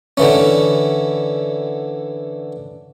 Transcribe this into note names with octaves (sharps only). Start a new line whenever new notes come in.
D3 E3 C#4